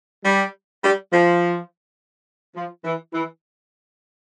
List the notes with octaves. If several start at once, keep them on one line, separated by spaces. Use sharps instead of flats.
G3
G3
F3
F3
E3
E3